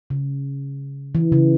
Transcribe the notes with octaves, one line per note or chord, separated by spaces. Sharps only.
C#3
E3
C#3